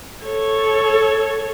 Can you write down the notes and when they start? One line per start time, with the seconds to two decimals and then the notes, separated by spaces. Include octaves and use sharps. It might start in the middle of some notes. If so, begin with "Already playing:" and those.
0.24 A4 C#5